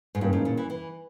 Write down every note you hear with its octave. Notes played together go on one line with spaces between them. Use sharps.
G#2
G2 C#3 E3 A#3
G#2
A#2
E3
E3